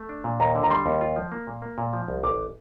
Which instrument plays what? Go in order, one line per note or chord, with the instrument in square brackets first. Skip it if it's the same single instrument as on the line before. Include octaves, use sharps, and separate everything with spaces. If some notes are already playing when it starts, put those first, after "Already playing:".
Already playing: [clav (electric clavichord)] A3
D4
A#2
[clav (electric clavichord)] D#2 [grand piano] A#5
[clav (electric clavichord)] D3
[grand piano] A#5
[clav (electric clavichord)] G3 [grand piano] C6
[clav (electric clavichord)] D#2
F4
F3
A#3
A#2
A#3
A#2
F3
C2
[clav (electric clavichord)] A1 [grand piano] D6